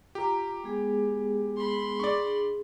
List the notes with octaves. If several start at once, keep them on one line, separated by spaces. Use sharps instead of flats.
F4 G4 A#5
G#3 B3 G#4
B5 C6
D4 G#4 D5 C#6